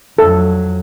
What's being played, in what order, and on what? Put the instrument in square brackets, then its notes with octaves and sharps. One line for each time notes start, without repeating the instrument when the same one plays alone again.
[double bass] F2 F#3 [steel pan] A4